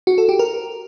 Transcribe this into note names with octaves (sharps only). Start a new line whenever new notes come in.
F#4
A4
G4
A#4